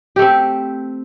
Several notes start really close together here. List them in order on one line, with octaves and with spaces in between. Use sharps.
G4 A3 C4